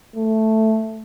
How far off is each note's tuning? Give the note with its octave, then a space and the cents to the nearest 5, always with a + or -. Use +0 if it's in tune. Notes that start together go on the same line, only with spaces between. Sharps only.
A3 +0